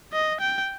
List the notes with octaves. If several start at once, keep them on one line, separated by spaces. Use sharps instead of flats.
D#5
G5